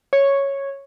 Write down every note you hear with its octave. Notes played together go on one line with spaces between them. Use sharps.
C#5